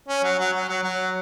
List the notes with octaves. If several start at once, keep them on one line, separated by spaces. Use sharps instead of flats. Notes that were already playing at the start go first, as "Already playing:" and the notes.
C#4
F#3
F#3
F#3
F#3
F#3